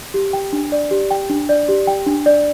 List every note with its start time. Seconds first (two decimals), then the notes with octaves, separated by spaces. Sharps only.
0.14 G4
0.33 G5
0.53 D4
0.72 D5
0.91 G4
1.11 G5
1.30 D4
1.49 D5
1.68 G4
1.87 G5
2.06 D4
2.26 D5